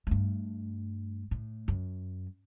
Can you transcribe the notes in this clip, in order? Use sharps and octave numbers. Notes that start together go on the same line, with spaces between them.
G2 A3
A2
F#2